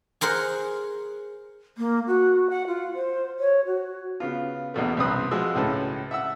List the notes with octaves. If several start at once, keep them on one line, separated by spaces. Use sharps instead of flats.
G#4 A#4 C5 F#5
A#3
F#4
F#5
F4
C5
C#5
F#4
C#3 B3 F4
A#1 E2 B2 A3
C2 F#2 C4 B4 D#6 F#6
F3 G#3 F#4 E6
C#2 A2 C#4 B4 A5
E5 F#5 E6